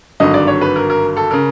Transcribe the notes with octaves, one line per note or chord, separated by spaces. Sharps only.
G#1 G2 D3 F#3 D#5
D5
C#5
B4
A#4
A#4
A4
C#3 A#4